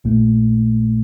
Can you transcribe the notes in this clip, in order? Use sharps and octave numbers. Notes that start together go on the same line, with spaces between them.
A#1 A#2 A3